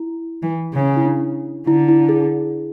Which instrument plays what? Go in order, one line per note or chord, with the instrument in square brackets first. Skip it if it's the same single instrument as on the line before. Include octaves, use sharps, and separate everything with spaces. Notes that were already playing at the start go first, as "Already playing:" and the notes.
Already playing: [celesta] E4
[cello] E3
C#3
[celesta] E4
D4
[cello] D3 [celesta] E4
[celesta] E4
G#4